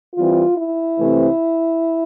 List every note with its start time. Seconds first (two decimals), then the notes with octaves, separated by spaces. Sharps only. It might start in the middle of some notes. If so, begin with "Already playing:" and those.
0.15 E3 G3 C4 F4
0.57 E4
0.98 C3 E3 A3 C4